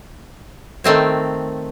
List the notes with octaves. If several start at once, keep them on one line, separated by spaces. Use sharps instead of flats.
D#3 A3 C4 C#5